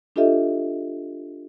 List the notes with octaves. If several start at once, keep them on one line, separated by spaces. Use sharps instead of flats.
D4 F4 G4 A4 D#5 E5